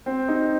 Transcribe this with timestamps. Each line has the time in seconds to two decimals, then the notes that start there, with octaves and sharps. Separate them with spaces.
0.06 C4
0.28 D#4